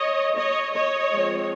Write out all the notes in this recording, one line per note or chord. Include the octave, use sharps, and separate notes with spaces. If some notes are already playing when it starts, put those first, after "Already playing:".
Already playing: C#5 D#5
C#5 D#5
C#5 D#5
F3 G#3 C4